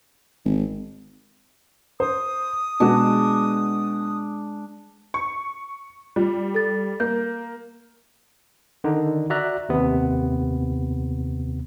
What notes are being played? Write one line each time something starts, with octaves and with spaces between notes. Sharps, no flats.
G#1
C5 D#6
B2 G#3 D4 F#4
C#6
G3 F4
A4 A6
A#3 G6
D3 D#3 D#4
F#4 D5 E5 A#5 F#6
D#2 C3 B3